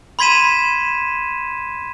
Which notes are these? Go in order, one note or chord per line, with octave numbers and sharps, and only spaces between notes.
B5 C6 G#6 B6 D#7 E7